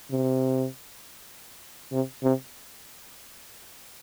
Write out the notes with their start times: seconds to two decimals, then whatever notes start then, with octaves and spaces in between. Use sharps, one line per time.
0.11 C3
1.92 C3
2.23 C3